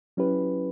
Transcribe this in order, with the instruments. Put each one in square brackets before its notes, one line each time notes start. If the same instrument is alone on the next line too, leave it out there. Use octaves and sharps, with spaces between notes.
[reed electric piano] F#3 C#4 E4 G4 B4